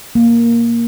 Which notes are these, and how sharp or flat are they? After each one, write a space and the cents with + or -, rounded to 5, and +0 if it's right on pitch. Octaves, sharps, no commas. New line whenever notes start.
A#3 +0